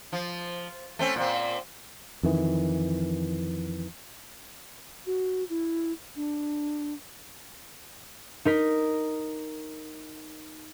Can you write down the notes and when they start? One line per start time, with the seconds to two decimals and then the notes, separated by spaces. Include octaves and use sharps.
0.12 F3
0.99 A3 C4 C#4
1.16 A#2 C4
2.23 F2 D#3 E3
5.06 F#4
5.49 E4
6.16 D4
8.45 D#4 A#4 B6